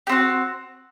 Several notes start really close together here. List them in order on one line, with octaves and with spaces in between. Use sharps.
G4 C4 F#4